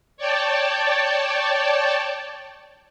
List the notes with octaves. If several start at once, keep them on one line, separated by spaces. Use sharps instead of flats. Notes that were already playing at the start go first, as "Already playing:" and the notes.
C#5 D5 G5 A5